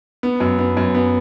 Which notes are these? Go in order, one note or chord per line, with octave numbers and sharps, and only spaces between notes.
B3
F#2
B3
F#2
B3